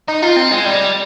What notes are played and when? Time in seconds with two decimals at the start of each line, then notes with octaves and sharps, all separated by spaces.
0.08 D#4
0.22 F4
0.36 C4
0.51 G#3
0.66 G3